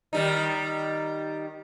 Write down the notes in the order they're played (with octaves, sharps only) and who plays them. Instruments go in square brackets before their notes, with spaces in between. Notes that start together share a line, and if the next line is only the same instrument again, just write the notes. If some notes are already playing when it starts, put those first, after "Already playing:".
[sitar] D#3 G3 D#4